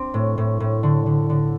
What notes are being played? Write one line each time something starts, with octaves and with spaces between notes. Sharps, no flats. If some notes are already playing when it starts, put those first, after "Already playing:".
Already playing: C4 D4
A2
A2
A2
D3
D3
D3